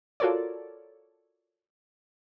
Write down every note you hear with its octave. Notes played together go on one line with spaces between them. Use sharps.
F4 F#4 A4 A#4 C#5 D5